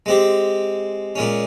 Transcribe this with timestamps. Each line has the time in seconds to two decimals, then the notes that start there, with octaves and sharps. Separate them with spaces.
0.06 G#3 C4 G4
1.16 A#2 G#3 C#4